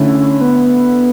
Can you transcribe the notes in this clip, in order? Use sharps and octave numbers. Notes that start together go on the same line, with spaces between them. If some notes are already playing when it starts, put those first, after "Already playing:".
Already playing: D3 A3 C#4 E4
B3